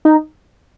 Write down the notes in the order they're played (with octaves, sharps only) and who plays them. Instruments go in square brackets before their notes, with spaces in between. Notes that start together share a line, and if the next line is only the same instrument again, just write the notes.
[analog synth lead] D#4